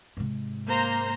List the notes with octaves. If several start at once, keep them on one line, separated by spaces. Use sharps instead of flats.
G#2 C3
A#3 C5 A#5